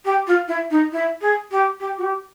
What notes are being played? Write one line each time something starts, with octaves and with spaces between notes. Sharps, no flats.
G4
F4
E4
D#4
E4
G#4
G4
G4
F#4
G4